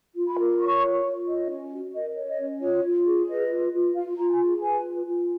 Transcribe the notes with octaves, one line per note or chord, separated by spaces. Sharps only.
F4
B5
A#4
C#5 C#6
F4
F4
C#5 D#5
C#4
F#4
A#4 D#5
C#5
D#5
C#4
F4 C#5
F4
G#4
B4 D#5
F4
F4
F4 F5
F4 A#5
G#5
G#4
B4 G#5
F4
F4